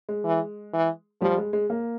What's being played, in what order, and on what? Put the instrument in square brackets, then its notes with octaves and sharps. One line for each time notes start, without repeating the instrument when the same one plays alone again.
[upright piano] G#3
[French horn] E3
E3
[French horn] F3 [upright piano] G3
[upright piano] G#3
G#3
A#3